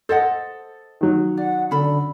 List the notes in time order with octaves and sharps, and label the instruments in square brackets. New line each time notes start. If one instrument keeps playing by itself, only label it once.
[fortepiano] A4 [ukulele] C5 D#5 F#5
[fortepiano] D#3 F#3
[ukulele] D5 [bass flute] F#5
[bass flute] D3 [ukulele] C#4 A4 B5